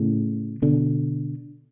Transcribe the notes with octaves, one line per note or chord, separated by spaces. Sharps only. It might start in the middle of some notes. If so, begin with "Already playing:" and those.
Already playing: A2 C#3
B2 D3